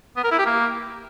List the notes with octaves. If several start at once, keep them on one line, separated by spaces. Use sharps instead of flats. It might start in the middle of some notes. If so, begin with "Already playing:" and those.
B3
A#4
E4
G4
A#3